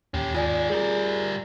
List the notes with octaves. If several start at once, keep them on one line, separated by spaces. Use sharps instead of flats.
D#2 C#4 G4
D#3 F4 G#4 D5 G#5
G3 G#4 A#4